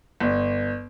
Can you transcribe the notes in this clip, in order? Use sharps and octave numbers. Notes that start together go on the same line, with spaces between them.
G1